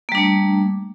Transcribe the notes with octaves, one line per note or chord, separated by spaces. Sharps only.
G3 A3 A#3 D4